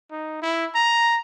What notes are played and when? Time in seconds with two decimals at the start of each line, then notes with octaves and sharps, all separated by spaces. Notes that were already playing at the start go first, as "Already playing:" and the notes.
0.11 D#4
0.42 E4
0.75 A#5